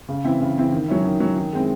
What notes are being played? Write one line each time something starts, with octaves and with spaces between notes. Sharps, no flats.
C#3
E3 C4 E4
C#3
E3 C4 E4
D#3
F#3 C#4 E4
D#3
F#3 C#4 E4
D#3
G#3 C4 E4